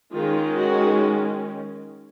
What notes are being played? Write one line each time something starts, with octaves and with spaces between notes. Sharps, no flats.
D#3 G#3 C#4 F4
F#4